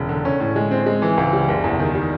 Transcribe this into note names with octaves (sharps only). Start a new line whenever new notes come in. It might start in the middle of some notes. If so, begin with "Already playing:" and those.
Already playing: E1 C#3
D3
C#4
A2
G#3
C4
G#3
E3
C#2
G3
F#1
E2
D#3
G3